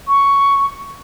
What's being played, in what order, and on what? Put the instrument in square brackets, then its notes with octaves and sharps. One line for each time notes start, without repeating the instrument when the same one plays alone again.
[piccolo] C#6